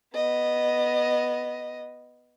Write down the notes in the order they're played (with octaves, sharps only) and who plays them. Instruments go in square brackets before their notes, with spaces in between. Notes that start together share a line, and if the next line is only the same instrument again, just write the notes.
[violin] B3 D#5